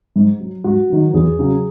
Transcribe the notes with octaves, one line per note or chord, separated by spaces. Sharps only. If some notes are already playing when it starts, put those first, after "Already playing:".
G#2
F#3
G#2 F#4
D#3 F#3
E2 G#4
C#3 F#3